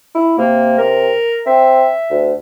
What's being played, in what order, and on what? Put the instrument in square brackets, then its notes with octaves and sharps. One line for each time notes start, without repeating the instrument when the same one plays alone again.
[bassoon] E4
[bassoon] C3 [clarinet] A#3
[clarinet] A#4
[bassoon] C4 [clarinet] E5
[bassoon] D2